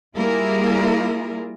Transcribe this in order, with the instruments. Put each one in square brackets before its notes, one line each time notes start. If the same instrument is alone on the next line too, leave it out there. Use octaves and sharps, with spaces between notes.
[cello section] G3 A#3 E4 F4 G#4 A#4